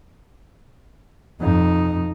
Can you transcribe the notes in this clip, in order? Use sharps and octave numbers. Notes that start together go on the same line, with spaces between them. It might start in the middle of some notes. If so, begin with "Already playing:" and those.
F2 D#4